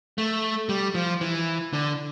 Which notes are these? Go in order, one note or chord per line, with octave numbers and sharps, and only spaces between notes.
A3
G3
F3
E3
D3